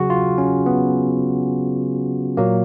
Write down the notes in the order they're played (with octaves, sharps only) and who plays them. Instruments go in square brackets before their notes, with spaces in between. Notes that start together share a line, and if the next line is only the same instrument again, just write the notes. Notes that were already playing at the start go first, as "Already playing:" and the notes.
Already playing: [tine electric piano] C#3 F#3 F#4 G#4
F4
C#4
B3
A#2 F#3 A#3